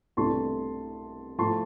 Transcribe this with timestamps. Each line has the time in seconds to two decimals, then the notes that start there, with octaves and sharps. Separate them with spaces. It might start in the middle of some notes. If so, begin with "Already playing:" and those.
0.17 C2 B2 A3 D4 A5 C6
1.39 A2 F3 A5 C6